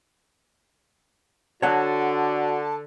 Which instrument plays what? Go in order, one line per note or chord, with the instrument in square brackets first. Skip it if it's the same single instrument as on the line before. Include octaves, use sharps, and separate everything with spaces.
[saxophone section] D3 [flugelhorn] F#4 [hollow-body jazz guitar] C#5 F#5 [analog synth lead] A5